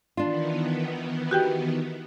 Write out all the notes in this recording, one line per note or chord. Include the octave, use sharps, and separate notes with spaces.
D#3 E3 B3 D4 F4
F#4 G4 G5